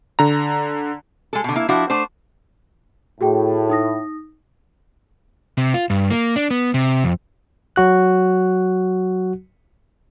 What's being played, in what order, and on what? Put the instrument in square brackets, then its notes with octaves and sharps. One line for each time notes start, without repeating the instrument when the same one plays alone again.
[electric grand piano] D3 A#5
[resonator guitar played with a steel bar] G#3 A4
B2 D3
A#3 E4
F3 D4 E4 F#4
A3 D4 C5
[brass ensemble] A2 [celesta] F#4 G#4 G5
[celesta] D#4 D#6 A#6
[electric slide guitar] C3
F4
G2
A#3
D4
B3
C3
F2
[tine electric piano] F#3 F#4 F#6